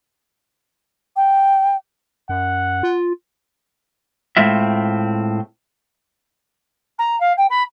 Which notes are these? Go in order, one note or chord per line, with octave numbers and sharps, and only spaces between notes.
G5
F#2 F#5
F4
A2 G#3 C4 F4 E5
A#5
F5
G5
B5